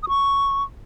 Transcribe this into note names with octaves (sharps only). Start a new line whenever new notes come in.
D#6
C#6